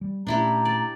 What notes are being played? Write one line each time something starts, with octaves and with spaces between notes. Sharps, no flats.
G3
A#2 A3 C#4 D4 E4 G4 A#5
D5